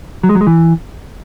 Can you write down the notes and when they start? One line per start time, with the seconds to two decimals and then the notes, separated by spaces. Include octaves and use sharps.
0.23 F#3
0.29 G#3
0.35 F#3
0.41 G#3
0.47 E3